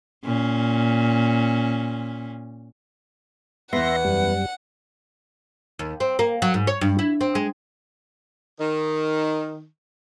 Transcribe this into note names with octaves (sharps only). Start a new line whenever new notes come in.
A#2 C#4
E2 B3 E5 F#5 C6 A#6
F#2 G3
D#2
C4
A#3
F#3
G#2
C#5
G2
E4
C4
G#3
D#3